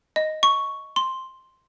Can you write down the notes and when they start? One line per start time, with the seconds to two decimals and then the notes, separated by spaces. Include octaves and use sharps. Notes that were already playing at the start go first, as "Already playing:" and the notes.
0.16 D#5
0.43 C#6
0.96 C6